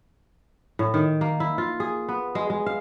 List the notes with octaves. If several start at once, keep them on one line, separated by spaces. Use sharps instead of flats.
A2
D#3
A#3
E4
F4
G#4
B3
G#3
G#3
F5